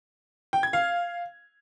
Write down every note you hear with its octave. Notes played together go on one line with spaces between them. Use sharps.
G5
G#6
F5